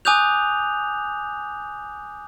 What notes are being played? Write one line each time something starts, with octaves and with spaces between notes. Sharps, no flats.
G#5 D6 D#6 F#6 G6 F7